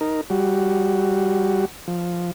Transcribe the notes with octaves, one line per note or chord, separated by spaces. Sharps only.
D#4 A#4
G3 F#4
F3